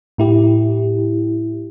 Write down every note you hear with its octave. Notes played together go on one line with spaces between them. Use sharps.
A2 E4 G4